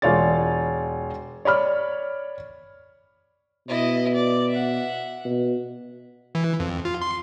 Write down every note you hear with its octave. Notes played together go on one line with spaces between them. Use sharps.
E1 F4 C#5 D5 A6
C#5 D5 B5 F6
B2 E4 D#5
D5
E5 F#5
B2
E3
F2
F4
C6